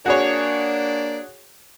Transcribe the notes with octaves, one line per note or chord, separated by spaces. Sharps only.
A#3 D4 F#4 G#4 C#5